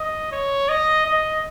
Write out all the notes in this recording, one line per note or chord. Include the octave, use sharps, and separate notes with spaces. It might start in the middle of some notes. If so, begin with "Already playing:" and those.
Already playing: D#5
C#5
D#5
D#5